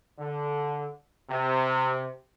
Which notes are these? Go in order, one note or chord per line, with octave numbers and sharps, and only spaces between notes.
D3
C3